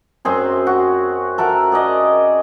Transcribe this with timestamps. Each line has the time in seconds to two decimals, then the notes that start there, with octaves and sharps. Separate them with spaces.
0.25 F#2 C4 G#4 C6
0.67 F#4
1.38 A4 A#4 E5 F#5
1.72 G#4 D5 D#5